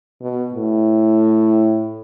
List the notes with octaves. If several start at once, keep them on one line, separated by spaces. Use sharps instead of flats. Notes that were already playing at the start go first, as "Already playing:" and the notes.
B2
A2